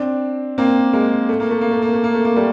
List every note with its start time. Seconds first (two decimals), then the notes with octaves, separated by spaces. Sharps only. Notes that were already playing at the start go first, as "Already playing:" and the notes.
Already playing: C4 D4
0.58 A#3 C4
0.93 G#3 A#3
1.29 A3
1.40 A#3
1.51 A3
1.61 A#3
1.71 A3
1.82 A#3
1.93 A3
2.04 A#3
2.14 A3
2.25 A#3
2.36 G3 A3